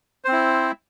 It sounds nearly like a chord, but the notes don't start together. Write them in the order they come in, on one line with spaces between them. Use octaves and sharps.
C5 C4 E4